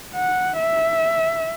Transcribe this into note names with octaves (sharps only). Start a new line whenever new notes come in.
F#5
E5